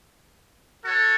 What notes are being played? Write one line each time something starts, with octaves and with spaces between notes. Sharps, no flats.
F#4 A4 C#5